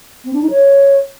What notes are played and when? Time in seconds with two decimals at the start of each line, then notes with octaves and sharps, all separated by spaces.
0.24 C4
0.33 D4
0.42 D#4
0.50 C#5